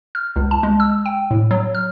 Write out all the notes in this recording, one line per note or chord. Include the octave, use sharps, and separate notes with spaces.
F6
C#2
A5
G#3
E6
G5
A2
F#3
F6